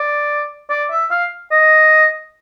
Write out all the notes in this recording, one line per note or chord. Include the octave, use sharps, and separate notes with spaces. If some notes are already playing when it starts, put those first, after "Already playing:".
Already playing: D5
D5
E5
F5
D#5